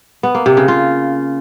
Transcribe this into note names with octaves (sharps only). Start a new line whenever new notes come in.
B3
A#3
C3
C#3
F4